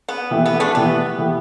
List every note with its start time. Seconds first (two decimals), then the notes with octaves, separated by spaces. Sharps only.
0.09 B3
0.31 E3 A3 G4 E5
0.46 B3
0.60 A3 D4
0.75 E3 A3 B3 G4 E5
1.18 E3 A3 G4 E5